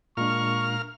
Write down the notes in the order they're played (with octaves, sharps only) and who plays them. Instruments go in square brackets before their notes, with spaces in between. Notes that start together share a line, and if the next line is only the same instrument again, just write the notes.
[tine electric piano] A#2 G#3 D4 [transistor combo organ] A#4 F5 F6 [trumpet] C#6